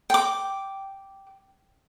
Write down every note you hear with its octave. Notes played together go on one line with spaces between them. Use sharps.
G5 D6